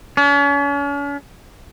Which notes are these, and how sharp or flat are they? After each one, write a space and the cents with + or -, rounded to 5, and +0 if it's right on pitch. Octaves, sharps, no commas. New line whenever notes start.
C#4 +40